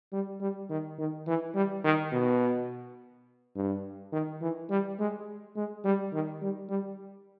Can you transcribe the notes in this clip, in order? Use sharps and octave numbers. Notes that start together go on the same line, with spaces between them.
G3
G3
D#3
D#3
E3
G3
D#3
B2
G2
D#3
E3
G3
G#3
G#3
G3
D#3
G3
G3